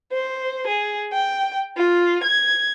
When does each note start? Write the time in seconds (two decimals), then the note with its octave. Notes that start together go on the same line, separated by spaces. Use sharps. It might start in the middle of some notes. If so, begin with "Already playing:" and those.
0.12 C5
0.67 G#4
1.13 G5
1.77 F4
2.23 G#6